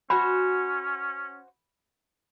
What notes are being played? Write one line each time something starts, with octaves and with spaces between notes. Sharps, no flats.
C#4 F#4 C5 G#5 B5